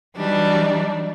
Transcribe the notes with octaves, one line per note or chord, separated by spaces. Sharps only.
E3 F#3 G3 D4 D#4